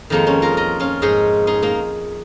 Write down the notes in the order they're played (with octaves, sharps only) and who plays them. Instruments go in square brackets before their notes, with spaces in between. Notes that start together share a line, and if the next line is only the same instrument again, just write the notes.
[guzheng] F2 D#3 G#3 A#3 D#4
C#4 F4
F4 A#4
A#4 D#5
C#4 F4
G#2 G#3 D#4 G#4
D#4 G#4
A#3 D#4